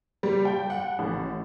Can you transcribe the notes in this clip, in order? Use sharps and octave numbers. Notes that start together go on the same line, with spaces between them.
G3
G5
F#5
A1